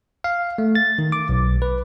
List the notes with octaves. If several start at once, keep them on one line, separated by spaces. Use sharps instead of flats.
F5
A3
A6
D#3
D6
B1
B4